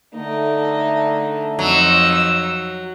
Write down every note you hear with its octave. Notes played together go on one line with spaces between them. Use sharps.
D3 A3 D#4
F2 F#3 D#4 E6